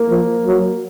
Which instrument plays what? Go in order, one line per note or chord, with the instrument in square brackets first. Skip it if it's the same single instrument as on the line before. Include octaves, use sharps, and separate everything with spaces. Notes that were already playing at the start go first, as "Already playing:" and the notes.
Already playing: [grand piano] A#3
[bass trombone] F3
F#3